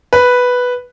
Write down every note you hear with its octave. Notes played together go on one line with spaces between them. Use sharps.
B4